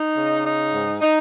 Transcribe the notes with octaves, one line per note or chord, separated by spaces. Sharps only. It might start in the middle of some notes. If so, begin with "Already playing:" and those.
Already playing: D#4
C#3
D#4
G#2
D#4